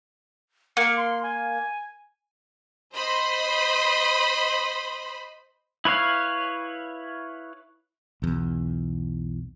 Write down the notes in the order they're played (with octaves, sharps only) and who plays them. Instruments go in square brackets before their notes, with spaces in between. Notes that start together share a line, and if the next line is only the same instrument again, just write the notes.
[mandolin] A#3 [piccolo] C#7
[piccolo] C6
G#5
[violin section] C5 D#5 B5 C6
[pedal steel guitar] E4 B4 C#5 F5
[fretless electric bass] B1 E2